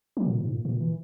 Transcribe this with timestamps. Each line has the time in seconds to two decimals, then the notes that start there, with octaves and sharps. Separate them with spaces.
0.17 F#3
0.25 B2
0.29 A#2
0.40 G#2
0.53 A#2
0.65 A#2
0.80 E3